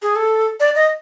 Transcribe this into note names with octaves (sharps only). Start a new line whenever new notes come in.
G#4
A4
D5
D#5